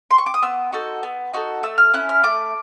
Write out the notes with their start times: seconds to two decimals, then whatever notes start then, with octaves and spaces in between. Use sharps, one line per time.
0.11 C6
0.18 C#6
0.26 D6
0.34 D#6
0.42 B3 E6
0.72 D#4 F#4 A4
1.03 B3
1.33 D#4 F#4 A4
1.63 A3 E6
1.78 F6
1.94 C#4 E4 F#6
2.09 F6
2.23 A3 D6